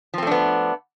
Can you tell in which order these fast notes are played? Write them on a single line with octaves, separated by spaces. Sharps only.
F3 C4 A3 D4 B3